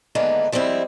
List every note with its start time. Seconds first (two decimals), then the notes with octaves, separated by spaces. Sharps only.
0.15 G#2 D3 D#3 A#3 B3 E4
0.52 F3 G3 G#3 C4 E4